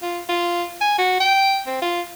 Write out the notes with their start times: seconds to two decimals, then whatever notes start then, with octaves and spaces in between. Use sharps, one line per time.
0.02 F4
0.29 F4
0.81 G#5
0.98 F#4
1.20 G5
1.66 C4
1.82 F4